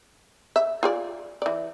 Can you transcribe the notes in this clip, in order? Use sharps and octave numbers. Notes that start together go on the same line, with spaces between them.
E5
F4 G#4 D5
E3 D5